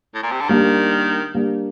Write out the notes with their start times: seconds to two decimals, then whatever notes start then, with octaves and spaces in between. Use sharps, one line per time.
0.15 A2
0.23 A#2
0.31 C3
0.41 D3
0.49 D#3 G3 A#3 D4 G4
1.34 G3 A#3 D4 G4